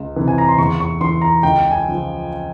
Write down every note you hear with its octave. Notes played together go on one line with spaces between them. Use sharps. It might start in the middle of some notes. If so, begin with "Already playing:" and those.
Already playing: C#2
C3 E3
G#5
A#5
C6
E2 C#6
C#6
E3 C6
A#5
C#2 G5
G#5
C#3 F3